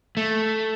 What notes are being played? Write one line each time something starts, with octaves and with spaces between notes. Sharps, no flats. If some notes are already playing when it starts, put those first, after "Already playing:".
A3